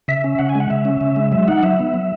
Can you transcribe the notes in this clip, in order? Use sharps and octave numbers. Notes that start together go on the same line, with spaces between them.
C#3 E5
C#4
C#3 F#5
G#5
G#3 F#5
C#3 E5
C#4
C#3
G#3
F#3 E5
D#4 F#5
F#3 E5
B3
F#3